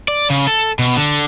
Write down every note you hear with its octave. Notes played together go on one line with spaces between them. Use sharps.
D5
C#3
A4
B2
D3